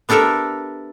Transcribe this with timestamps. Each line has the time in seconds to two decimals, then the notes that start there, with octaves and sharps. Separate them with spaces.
0.09 B3 D4 G4 A4 A#4 E5